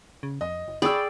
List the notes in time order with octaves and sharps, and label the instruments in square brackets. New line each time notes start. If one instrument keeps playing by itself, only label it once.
[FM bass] C#3
[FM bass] F2 [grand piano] D#5
[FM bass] F#1
[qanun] G#4 D5 G5 [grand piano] B5 C#6 E6